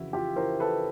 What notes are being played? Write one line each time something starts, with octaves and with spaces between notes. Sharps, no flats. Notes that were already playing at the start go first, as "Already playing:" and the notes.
Already playing: F2 C#3 E3 E4 F#4
F4 G4
E3 A#4 C5
A4 B4